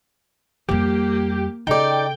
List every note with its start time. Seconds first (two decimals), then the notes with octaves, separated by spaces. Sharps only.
0.69 F2 G3 A#3 G4
1.67 C#3 D#4 A4 D5 G5